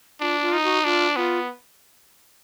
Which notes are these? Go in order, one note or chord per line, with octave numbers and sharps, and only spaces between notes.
D4 F4
F4
D#4
F#4
D4 F4
B3 F4